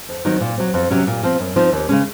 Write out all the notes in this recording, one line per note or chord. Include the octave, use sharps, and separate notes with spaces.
F2
D#3 F#3 C4 D#4
A#2
F#3 C4
F2
C3 F#3 C#4
A#2
F3 C4
F#2
F3 C4 D#4
D#2
C#3 G#3 C#4